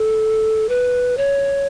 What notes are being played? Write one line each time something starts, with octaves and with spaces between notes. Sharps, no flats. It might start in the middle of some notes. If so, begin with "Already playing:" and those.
Already playing: A4
B4
C#5